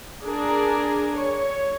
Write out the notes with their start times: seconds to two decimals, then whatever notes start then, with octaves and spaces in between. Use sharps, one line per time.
0.24 D4 G#4 A#4
1.17 C#5